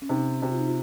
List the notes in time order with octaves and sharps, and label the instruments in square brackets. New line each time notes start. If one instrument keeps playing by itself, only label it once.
[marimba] C#4
[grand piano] C3 [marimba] D#4
[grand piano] C3 [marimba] F#4
[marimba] F4
D#4
F4